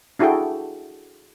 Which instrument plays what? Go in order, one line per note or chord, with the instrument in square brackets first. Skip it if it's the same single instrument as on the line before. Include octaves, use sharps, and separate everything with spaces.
[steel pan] D4 E4 F#4 G#4 A4 G5